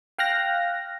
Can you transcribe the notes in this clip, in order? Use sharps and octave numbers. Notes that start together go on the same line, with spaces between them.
F5 G5 F6 F#6 A#6